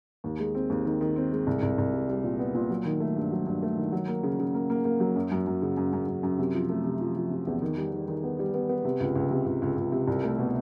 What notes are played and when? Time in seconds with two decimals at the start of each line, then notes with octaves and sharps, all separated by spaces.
0.24 D#2
0.40 G#3
0.55 C4
0.70 D#2
0.85 D#3
1.01 D#3
1.16 C4
1.32 G#3
1.47 C2
1.63 C2
1.78 C2
1.93 G3
2.09 G3
2.24 A#2
2.39 B3
2.54 A#2
2.70 F#3
2.85 D#3
3.00 A3
3.16 G2
3.32 F#3
3.47 G2
3.62 A3
3.77 D#3
3.92 F#3
4.08 A#3
4.23 C#3
4.40 C#3
4.54 A#3
4.70 A#3
4.85 A#3
5.00 F#3
5.16 F#2
5.31 F#2
5.47 F#2
5.62 C#3
5.77 F#2
5.93 F#2
6.07 F#2
6.23 F#2
6.39 C3
6.54 F3
6.69 A3
6.85 C3
7.01 F3
7.16 F3
7.31 C3
7.47 E2
7.62 D#3
7.78 G3
7.92 D#3
8.08 D#3
8.23 B3
8.39 G3
8.54 B3
8.69 B3
8.85 C3
9.00 C#2
9.16 C#2
9.31 C3
9.46 C#2
9.62 C#2
9.77 C#2
9.92 C3
10.08 C2
10.23 A3
10.39 B2